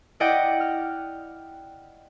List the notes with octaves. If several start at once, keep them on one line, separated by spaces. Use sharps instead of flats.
E4 D5 D#5 F#5 G5
F6